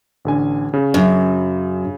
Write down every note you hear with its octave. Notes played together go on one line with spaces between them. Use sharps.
A1 D3 G#5
C#3
F#2